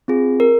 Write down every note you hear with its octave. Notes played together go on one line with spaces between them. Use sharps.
C4 F4 G#4
A#4